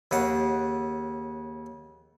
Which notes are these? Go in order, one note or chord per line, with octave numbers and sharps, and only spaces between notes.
D#2 C#3 F#5